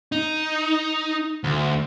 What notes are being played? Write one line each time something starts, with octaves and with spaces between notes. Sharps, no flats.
D#4
D2